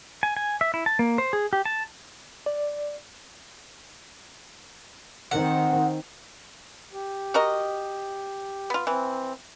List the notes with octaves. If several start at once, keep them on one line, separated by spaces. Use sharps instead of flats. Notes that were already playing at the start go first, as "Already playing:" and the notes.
G#5
G#5
E5
E4
A5
A#3
C5
G#4
G4
A5
D5
D#3 C4 F#5
G4
F#4 A#4 D#5
B3 F4
E3 C4